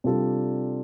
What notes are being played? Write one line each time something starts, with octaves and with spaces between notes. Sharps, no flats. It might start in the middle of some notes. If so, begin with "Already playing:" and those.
C3 G3 D4 F4 A4